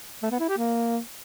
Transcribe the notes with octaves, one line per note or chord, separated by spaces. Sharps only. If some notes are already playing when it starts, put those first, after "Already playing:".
A3
B3
E4
G4
A#3